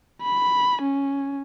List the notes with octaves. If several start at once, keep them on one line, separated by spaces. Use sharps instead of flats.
B5
C#4